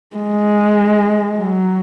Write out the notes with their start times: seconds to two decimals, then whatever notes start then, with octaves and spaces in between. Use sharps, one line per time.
0.16 G#3
1.38 F#3